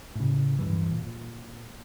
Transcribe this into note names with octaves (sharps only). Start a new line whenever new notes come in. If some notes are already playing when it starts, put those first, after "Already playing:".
A2 C#3
D1 G2 E3
A#2